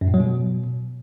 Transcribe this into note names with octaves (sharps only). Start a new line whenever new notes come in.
F#2
A2
F#3
B2